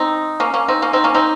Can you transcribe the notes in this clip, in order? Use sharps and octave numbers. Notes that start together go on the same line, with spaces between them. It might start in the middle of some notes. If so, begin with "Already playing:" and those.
Already playing: C4 D#4
A#3 C#4
A#3 C#4
C4 D#4
A#3 C#4
C4 D#4
A#3 C#4
C4 D#4